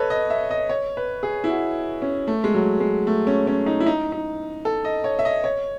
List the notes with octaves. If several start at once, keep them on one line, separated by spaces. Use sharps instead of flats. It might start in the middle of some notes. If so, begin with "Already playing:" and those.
Already playing: A4 B4 C#5 D#5
D#5
E5
D#5
C#5
B4
G#4
E4
F#4
C#4
A3
G#3
F#3
G#3
A3
C#4
C#4
D#4
E4
D#4
D#4
A4
D#5
C#5
E5
D#5
C#5